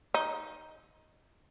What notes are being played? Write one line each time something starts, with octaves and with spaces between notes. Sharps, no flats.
D#4